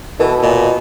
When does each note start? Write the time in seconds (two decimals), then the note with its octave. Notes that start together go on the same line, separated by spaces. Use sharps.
0.20 B2 E3 A4
0.43 A#2 B4 D#5 G#5